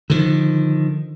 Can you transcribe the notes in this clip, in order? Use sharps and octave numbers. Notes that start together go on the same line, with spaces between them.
D3 D#3 F3